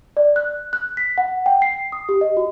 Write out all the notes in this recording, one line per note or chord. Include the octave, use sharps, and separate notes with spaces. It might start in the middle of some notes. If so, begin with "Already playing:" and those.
D5
F#6
F#6
B6
F#5
G5
C7
D#6
G4
D#5
F#4